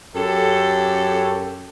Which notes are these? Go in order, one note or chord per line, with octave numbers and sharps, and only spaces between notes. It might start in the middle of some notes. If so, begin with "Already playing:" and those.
F#2 G4 A4